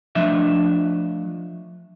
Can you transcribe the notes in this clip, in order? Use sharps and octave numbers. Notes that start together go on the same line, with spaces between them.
F3 A3 D4 D#5 E5